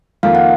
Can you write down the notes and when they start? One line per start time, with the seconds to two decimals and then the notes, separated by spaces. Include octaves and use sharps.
0.23 F2 D#3 A#3 F4 A4 F5
0.35 F#5